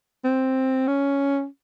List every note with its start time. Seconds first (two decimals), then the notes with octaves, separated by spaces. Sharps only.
0.25 C4
0.88 C#4